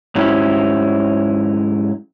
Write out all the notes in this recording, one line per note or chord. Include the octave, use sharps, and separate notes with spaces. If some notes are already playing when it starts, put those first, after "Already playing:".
G#2 F#3 C#4 E4 G4